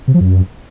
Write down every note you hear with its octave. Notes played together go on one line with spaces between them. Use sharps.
C3
F3
F#2